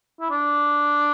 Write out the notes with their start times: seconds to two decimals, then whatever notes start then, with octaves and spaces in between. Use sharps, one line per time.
0.20 E4
0.31 D4